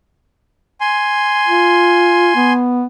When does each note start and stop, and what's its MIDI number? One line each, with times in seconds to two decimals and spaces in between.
0.80 2.53 80
0.80 2.53 84
1.47 2.35 65
2.36 2.84 59